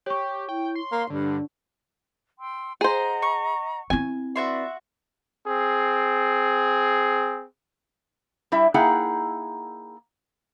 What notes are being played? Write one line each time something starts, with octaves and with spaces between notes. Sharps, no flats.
G4 C#5 C#6
E4 G5
C6
A#3 F5
G2 D3 D4
G5 C6 E6
G#4 C5 D#5 F#5 A#5
C#6
C4 E4 G#5
F#4 B4 D5 E5 C6
C4 G#4
G3 E4 E5
A#3 D#4 E4 G#4 F#5 G5